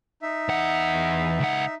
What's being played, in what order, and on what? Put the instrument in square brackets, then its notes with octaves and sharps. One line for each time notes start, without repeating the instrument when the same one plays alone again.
[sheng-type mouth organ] D#4 E5
[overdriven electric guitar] E2 F#5
C#2 F#5